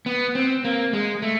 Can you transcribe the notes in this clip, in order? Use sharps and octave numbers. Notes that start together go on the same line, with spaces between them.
B3
C4
A#3
G#3
A3